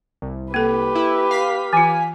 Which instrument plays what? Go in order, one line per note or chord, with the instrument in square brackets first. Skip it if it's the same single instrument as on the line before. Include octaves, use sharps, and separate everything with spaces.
[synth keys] C2
[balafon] A#3 A4 [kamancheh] G4 B4
[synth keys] E4
F5 B6
[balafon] E3 F4 [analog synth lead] G#5